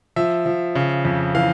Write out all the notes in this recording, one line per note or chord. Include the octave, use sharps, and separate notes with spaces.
F3 E5
F3
C#3
F2
E3 F5